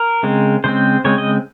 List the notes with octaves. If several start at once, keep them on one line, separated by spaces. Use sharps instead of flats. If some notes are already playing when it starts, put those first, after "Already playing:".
Already playing: A#4
C#3 G#3 C4
C#3 G#3 C4 C5
C#3 G#3 C4 C#5
D#5